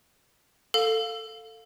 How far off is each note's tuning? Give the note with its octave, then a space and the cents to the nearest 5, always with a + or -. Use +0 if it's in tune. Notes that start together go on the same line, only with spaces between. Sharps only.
A4 +15 F5 +10